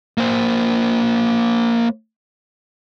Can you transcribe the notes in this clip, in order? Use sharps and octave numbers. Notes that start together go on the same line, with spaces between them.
A#3 C5